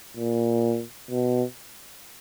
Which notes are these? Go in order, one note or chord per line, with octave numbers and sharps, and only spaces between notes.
A#2
B2